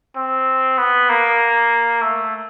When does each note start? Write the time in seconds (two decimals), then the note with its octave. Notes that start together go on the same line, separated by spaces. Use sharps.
0.16 C4
0.78 B3
1.09 A#3
2.02 A3